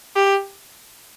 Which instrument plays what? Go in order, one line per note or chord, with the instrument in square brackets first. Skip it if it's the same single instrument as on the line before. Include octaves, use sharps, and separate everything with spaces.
[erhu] G4